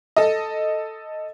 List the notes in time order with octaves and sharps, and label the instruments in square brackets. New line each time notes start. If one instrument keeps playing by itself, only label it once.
[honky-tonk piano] A4 D#5